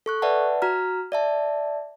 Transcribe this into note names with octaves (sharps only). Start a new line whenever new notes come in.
A4 C#6 F#6
B4 D5 E5 F#5 A5
F#4 A#5 F6
D5 E5 A5